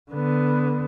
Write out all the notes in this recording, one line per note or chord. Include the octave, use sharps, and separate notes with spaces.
D3 B3